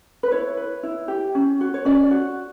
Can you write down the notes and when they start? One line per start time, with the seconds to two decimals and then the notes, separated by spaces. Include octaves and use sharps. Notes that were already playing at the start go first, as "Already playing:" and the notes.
0.23 B4
0.31 E4 C#5
0.57 B4
0.83 E4
1.08 G4
1.35 C#4
1.61 F#4
1.74 C#5
1.85 C#4 D5
2.11 F#4